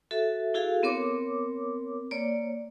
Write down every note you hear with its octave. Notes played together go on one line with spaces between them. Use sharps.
F#4 A4 E5
E4 F#4 G#4 A4 F5
B3 C4 A#4 C#5 D6
A#3 C#5 D5